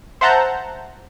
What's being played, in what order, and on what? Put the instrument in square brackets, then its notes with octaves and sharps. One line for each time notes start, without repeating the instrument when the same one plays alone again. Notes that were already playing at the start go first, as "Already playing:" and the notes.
[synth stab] C5 E5 F#5 A5 A#5 G6